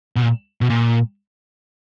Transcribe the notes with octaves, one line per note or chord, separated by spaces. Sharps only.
B2
A#2
B2
A#2